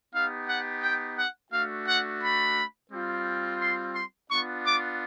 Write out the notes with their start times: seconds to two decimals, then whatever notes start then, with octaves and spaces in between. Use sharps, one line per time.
0.13 B3 D#4 G4 F5
0.48 F#5
0.82 G5
1.18 F#5
1.52 A3 D4 F#4 F5
1.88 F#5
2.22 B5
2.91 G3 C4 F4
3.60 C6
3.95 C6
4.29 B3 D4 F4 C#6
4.64 D6